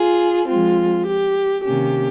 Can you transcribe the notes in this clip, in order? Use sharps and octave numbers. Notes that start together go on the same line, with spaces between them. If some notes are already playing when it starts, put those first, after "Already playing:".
Already playing: F4 G#4
F3 G#3 C4 F4
G4
C3 D#3 A#3 C#4 G4